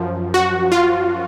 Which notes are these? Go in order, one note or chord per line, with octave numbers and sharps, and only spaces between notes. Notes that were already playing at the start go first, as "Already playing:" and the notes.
Already playing: F#2 F3
F#4
F4